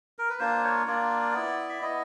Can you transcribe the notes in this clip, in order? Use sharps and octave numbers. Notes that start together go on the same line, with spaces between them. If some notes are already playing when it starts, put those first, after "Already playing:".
A#4
B4
A#3 D4 F4 C5
C#5
A#3 D4 F4 D5
B3 E4
E5
B3 E4 D#5